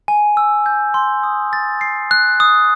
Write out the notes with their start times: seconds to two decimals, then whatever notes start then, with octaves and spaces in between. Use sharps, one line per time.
0.08 G#5
0.37 E6
0.66 G6
0.94 C6
1.23 D#6
1.53 A6
1.81 C7
2.11 F#6
2.40 D#6